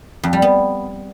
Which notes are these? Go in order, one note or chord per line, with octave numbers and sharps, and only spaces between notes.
F2
G3
B3